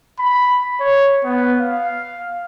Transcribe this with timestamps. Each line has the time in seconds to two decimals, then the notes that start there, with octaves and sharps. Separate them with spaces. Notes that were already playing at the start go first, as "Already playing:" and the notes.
0.19 B5
0.80 C#5
1.24 B3
1.61 F5